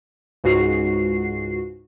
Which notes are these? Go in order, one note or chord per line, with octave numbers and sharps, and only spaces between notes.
C#2 G#2 F#4 C7